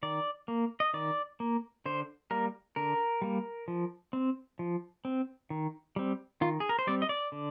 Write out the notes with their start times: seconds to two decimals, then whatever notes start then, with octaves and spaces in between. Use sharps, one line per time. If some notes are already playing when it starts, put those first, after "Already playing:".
0.03 D#3 D5
0.48 A#3
0.80 D#5
0.94 D#3 D5
1.40 A#3
1.86 D3 C5
2.31 G3 A#3 A#4
2.76 D3 A#4
3.22 G3 A#3
3.68 F3
4.13 C4
4.59 F3
5.05 C4
5.50 D#3
5.96 G3 C4
6.41 D#3 F4
6.60 G#4
6.69 A#4
6.79 C5
6.87 G3 C4 D5
7.02 D#5
7.09 D5
7.32 D3